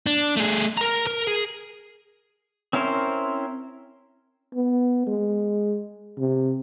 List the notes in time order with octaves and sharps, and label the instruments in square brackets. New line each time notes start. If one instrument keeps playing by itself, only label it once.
[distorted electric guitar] D4
A3 G#4
A#4 A#5
A#4
G#4
[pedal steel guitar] C4 C#4 E4 A#4 C5
[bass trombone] B3
G#3
C3